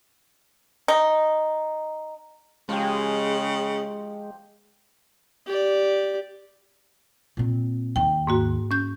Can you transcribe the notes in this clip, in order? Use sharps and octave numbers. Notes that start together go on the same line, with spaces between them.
D#4
C#3 F3 G#3 G4
G4 D5
A#2 C4
D#2 D#3 G5
G#2 A#3 F#4
C#4 G6